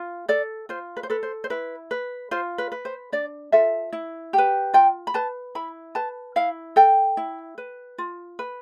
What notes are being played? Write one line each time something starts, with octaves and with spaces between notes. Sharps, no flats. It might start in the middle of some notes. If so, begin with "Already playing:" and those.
Already playing: F4
A4 D5
F4 C5
B4
C5
A4 B4
C5
C5
E4 B4
B4
F4 C5
B4
B4
C5
D4 D5
F4 A4 E5
E4
G4
B4
F4 G5
B5
B4 A5
E4 B5
B4 A5
E4 F5
A4 G5
E4
B4
F4
B4